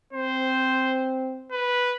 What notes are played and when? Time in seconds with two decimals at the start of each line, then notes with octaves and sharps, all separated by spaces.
0.13 C4 C5
1.52 B4